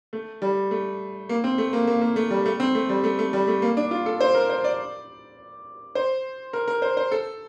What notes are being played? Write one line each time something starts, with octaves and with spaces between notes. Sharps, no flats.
A3
G3
A3
A#3
C4
A3
A#3
A#3
A#3
A3
G3
A3
C4
A3
G3
A3
A3
G3
A3
A#3
D4
F4
A4
C5
A#4
C5
D5
C5
A#4
A#4
C5
C5
A4